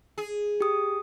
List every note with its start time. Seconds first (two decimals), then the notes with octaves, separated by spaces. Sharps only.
0.18 G#4
0.60 G4 D#6